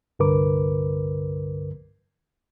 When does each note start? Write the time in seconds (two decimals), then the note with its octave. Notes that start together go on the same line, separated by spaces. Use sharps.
0.19 C2 G2 D3 A#4 B4 D6